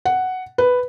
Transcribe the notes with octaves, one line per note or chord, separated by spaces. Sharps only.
F#5
B4